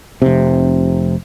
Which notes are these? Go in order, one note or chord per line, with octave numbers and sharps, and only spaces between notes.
F1 C3